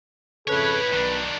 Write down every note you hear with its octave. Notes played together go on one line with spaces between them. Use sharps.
F2 C#3 E4 A4 B4 C#5
B1 D#3 D4